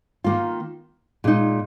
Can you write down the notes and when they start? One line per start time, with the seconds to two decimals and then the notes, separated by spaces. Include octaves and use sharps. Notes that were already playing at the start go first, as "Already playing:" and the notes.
0.24 D#3 A#3 F4
1.24 A#2 G#3 D#4